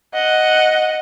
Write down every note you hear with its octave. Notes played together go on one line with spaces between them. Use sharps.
D#5 F#5